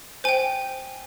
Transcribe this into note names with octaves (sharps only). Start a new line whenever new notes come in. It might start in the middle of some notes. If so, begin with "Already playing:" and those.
C5 G5 G#5